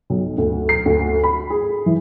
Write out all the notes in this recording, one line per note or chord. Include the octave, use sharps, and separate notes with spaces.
B1
D2
C7
D2
B5
G#4
E3